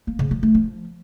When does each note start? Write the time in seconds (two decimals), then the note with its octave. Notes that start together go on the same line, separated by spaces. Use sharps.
0.07 A#3
0.19 C#3
0.31 F3
0.43 A3
0.55 F3